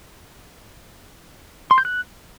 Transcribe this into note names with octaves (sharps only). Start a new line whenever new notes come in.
C6
G6
F#6